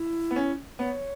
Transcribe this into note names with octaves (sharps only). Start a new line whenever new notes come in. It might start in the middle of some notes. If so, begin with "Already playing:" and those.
Already playing: E4
B3
C#4
B3 C#5